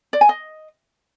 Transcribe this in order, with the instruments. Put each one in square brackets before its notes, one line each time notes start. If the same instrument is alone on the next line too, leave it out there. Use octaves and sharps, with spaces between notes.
[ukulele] D5
G#5
D#5